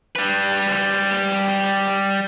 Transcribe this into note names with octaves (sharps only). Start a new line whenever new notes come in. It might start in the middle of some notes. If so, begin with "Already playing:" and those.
G3 B4